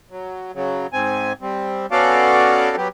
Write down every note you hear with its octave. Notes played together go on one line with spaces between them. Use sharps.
F#3
C#3 F#3
G#2 C4 G#5
G3 C4
B3 C#4 F#4 A4 D5 F5
F#3 B3 G4